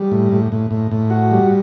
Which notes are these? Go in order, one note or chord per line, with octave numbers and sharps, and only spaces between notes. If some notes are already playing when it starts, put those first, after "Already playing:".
Already playing: G3
A2
A2
A2
A2
A2
F#4
G3